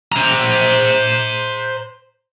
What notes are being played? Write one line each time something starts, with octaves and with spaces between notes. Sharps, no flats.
C5 A#5